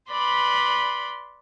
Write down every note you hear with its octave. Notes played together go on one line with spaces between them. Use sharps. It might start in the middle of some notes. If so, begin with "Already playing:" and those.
B4 D5 B5 C6